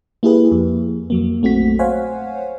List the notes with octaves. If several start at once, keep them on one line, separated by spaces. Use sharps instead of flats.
A#3 E4 G4 G#4 B4
F2
F2 F#3 A#3
A#1 A3 C4 F#4 B6
C5 C#5 F5 F#5 G#5